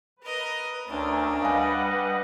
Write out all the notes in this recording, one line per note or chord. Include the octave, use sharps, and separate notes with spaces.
A#4 B4 D#5
D2 C#4 D4 A#4
G3 B4 D#5 F5 F#5 G#5